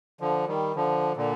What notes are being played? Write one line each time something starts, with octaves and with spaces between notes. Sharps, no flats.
D3 F3
D#3 G3
D3 F3
A#2 D3